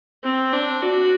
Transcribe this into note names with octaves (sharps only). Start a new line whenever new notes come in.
C4
D4
F#4